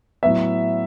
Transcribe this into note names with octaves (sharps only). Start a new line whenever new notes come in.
A2 F#3 B3 E5